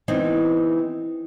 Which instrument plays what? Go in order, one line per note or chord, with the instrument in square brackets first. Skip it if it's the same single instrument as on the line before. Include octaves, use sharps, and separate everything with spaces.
[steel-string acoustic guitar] E3 B3 C4 D#4